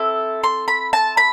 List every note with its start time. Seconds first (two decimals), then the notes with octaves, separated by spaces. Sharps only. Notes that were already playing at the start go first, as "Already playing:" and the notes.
Already playing: C4 E4 A4
0.44 C6
0.68 B5
0.93 A5
1.17 B5